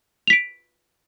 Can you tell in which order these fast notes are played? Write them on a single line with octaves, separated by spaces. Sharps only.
F7 B6 D7